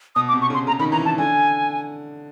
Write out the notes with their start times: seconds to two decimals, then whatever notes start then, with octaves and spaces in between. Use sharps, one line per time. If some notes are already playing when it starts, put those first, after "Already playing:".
0.16 B2 D#6
0.28 D6
0.33 C3
0.41 C#6
0.50 C#3 C6
0.67 C#3 A#5
0.79 D#3 B5
0.92 E3 A#5
1.05 D#3 A5
1.18 D3 G#5